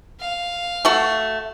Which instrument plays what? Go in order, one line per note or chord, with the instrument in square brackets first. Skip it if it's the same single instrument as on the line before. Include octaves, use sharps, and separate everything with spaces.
[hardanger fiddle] F5
[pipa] A3 F#4 A4